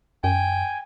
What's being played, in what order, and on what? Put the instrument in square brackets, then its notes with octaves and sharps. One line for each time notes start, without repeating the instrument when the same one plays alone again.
[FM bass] F#2 [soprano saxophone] G5 [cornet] G#5